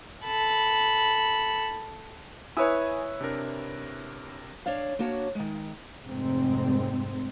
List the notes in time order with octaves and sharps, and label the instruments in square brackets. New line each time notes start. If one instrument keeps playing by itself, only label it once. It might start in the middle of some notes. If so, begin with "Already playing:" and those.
[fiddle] A4 B5
[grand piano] E4 B4 C#5 [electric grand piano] G#5 D#6 E6
[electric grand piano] C3 D4 A#4
[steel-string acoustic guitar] D4 C#5 D5 F5
A#3 D4 F#4 C#5
D#3 G#3
[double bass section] F1 G#2 C4